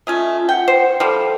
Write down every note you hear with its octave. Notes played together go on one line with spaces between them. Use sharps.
A3 C#4 F4 D#5
F#5 G5
C5
F3 G3 A4